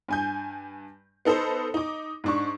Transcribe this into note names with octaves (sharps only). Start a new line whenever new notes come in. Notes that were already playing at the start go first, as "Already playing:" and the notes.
G2 G#5 G6
B3 D#4 A4 B4 C5
D#4 D6
G#2 D4 C#6